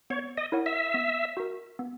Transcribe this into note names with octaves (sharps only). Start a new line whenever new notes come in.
B3 C#5
D#5
E4 A#4 C#5 F#5
E5
B3
F#4 A#4
B3